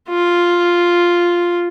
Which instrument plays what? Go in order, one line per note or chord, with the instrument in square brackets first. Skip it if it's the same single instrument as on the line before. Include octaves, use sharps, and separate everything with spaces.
[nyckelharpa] F4